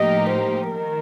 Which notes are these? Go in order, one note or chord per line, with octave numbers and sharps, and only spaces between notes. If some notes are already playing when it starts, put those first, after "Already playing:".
Already playing: A2 F3 A#3 D#4 G4 D#5
C5
D#3 A#4